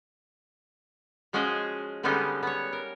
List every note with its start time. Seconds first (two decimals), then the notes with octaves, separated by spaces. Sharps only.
1.33 F3 G#3 C#4 F#4 G#4 D#5
2.03 D3 G3 G#3 B3 C#4 D#4
2.43 B3 C#5
2.73 A#4